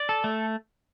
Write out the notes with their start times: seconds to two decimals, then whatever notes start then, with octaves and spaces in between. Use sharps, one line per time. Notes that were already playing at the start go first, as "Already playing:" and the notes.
Already playing: D5
0.09 A4
0.24 A3